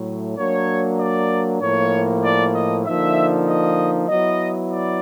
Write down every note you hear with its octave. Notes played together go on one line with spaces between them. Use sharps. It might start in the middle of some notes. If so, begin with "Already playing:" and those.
Already playing: A2 F#3 A3
F#3 A#3 D4 C#5
D5
A2 F3 A#3 C#5
D5
D#5
D3 F3 A#3 D#4 E5
D#5
F#3 B3 E4 D#5
D5